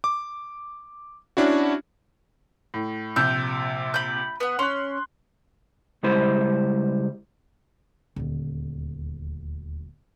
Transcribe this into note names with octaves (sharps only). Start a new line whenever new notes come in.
D6
C#4 D4 E4 F#4
A2
A#1 C3 E6 G6
B5 G6
B3 F#5
C#4 C6 F#6
C#2 G3 G#3 E4 C5 B5
D#1 D2